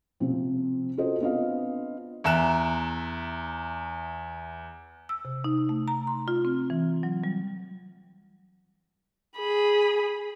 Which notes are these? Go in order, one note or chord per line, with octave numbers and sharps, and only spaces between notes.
C3 F3 C4
F4 F#4 A4 C5 D#5
B3 C4 D4 F4 D#5 F5
E2 E5 A#5 F#6 E7
E6
C3
D#4
A3
A#5
C6
F4
C4
E3
F#3
G3
G#4 B5